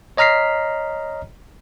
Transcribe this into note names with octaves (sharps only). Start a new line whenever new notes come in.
C#5 D#5 A#5 F6 B6 C7